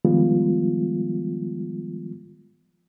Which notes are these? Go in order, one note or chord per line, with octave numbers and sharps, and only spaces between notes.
D#3 F3 G3 G#3 B3 F4